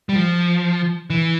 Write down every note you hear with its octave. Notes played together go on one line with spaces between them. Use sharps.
G3
F3
E3